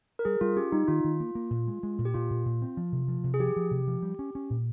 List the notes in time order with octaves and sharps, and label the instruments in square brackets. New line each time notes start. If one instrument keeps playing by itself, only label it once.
[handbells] A#4
[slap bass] G3 [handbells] G#4
[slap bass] G3 [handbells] F4
[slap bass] C#4 [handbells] G4
[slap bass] G3 [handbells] D#4
[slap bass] D#3 [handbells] F4
[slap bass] D#3
A#3
A#3
A#2
G#3
G#3
A#2
[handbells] G4
[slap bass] A#2 [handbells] F4
[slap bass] A#2
A#2
C4
F3
C3
F3
C3
[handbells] G#4
[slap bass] F3 [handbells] G4
[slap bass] F3
C3
F3
G3
C#4
C#4
A#2